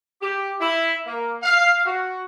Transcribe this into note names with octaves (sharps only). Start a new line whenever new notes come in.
G4
E4
A#3
F5
F#4